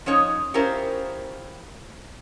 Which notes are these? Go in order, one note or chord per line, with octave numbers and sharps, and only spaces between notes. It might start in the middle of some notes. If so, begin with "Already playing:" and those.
F3 C#4 D#4 C#5 D#5
C#4 E4 F4 G4 A#4 C5